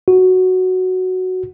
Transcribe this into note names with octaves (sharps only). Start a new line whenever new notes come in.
F#4